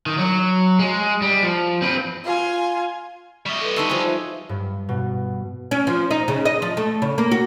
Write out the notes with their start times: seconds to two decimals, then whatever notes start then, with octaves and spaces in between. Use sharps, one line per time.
0.06 D#3
0.18 F#3
0.79 G#3
1.22 G3
1.42 F3
1.82 C4 B4
2.24 F4 G#5
3.46 G3 D#5 E5 C#6
3.61 A4 B4
3.76 D#4 B4 A5 C6 C#6 E6
3.89 F3 G#4
4.03 F4 E5
4.49 G2
4.89 B2
5.71 C#4
5.87 F3
6.11 D#4
6.28 C#3
6.45 D#5
6.62 F3
6.77 A3
7.02 C#3
7.18 A#3
7.32 F#4